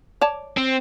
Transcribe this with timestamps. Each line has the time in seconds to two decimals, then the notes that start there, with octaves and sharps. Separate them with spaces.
0.21 C#5 D5 A5
0.57 C4